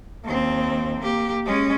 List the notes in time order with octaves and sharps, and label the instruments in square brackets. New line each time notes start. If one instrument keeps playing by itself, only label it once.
[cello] D#2 C4
A#3 G4
G#3 C#4